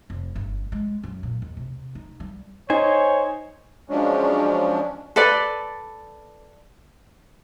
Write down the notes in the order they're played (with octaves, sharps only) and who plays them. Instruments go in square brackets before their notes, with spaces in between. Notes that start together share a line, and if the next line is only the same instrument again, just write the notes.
[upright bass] F1
G1
G#3
F#2
A#2
D#2
C3
D#4
G3
[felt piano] D#4 [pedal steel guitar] C5 G#5 [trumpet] C#5
[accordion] F3 F#3 G#3 C#4 D4
[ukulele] A4 B4 D5